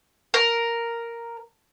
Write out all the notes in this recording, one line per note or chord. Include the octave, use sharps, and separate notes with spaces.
A#4